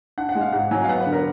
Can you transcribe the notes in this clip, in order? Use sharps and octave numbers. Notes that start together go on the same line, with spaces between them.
D4 F#5
F#5
G#3
F5
G#2 F#5
F#3 G#5
F5
B3 F#5
B4
D3
A#4